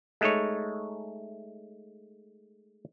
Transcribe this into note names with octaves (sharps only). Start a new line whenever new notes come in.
G#3 A3 D#4 C#5